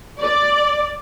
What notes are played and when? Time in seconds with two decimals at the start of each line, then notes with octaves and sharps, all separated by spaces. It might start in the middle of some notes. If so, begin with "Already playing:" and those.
0.20 D5